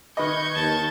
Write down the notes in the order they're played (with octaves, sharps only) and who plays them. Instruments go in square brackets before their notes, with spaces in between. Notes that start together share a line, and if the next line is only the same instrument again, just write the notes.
[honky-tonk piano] D#3 B4 D#5 [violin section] C#6 G6 G#6
[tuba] D#2 [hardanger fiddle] A5